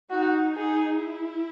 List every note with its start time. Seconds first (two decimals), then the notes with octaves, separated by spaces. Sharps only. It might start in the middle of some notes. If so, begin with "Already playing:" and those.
0.10 D#4 F#4
0.56 D#4 G#4
1.00 E4